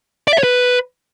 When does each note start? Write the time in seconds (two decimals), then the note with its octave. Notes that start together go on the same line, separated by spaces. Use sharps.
0.28 D5
0.33 E5
0.38 C#5
0.43 B4